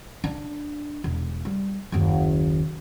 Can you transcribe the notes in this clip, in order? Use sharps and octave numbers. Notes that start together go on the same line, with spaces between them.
D4
E1
G3
F#1 D#2